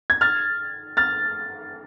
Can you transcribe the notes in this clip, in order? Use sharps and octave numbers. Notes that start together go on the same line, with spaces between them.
G#6
F6 A6
F6 A6